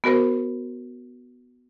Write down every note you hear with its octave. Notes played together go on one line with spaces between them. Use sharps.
B3 F#4 A#4 C5